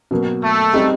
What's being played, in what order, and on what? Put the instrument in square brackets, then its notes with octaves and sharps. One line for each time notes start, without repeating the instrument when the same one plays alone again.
[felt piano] B2 F#3 A#3
[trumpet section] A3
[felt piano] G3 C4 D#4 G#4